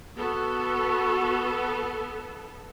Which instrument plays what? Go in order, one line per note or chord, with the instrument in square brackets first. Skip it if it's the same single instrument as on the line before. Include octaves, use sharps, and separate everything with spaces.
[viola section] B3 A4 [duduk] F#4